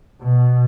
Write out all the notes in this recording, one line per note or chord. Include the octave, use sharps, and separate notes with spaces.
B2